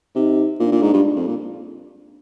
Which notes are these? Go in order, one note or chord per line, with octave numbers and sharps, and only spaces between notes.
C3 D#4
A#2 D4
A#2
G#2
G2
F2
A#2